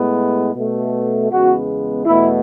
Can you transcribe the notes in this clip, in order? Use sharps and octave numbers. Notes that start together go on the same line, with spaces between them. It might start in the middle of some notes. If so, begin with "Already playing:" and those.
Already playing: A2 G#3 B3
B2 A3
E2 C#3 G#3 B3 F#4
E2 B2 A3 E4